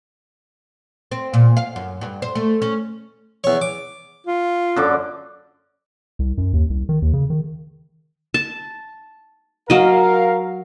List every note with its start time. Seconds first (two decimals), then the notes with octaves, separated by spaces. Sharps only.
1.11 C4
1.34 A#2
1.57 F5
1.76 F#2
2.01 G2
2.22 C5
2.35 A3
2.62 C#4
3.44 E2 C#5
3.62 D6
4.27 F4
4.76 F#2 D3 D6
6.19 C2
6.38 F#2
6.53 D#2
6.70 C2
6.89 D#3
7.02 D#2
7.13 C#3
7.30 D#3
8.34 A5
9.70 F#3 A#4 D#5 F5